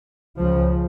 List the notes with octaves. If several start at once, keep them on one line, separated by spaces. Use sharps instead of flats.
C#2 C#3 F3